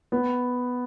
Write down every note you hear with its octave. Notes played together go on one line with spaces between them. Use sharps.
B3